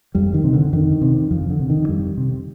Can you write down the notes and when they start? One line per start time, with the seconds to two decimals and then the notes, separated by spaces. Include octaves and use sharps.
0.15 F2 G3
0.34 D#3
0.44 C3
0.53 D3
0.73 F2 D#3
1.01 C3
1.31 F2 F3
1.50 D3
1.60 C3
1.69 D#3
1.88 F2 G3
2.17 C3